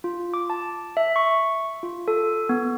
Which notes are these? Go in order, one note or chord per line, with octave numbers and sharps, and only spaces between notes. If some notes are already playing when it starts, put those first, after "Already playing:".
F4
D6
A5
E5
C#6
F4
A4
B3